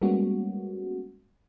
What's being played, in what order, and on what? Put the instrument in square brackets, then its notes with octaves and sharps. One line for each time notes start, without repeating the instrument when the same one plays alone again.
[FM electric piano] G3 G#3 A#3 B3 C#4 F#4